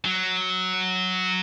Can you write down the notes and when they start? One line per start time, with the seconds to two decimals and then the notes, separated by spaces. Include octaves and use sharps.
0.05 F#3